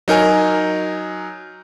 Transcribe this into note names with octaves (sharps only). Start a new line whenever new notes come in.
F#3 D#4 A#4 G#5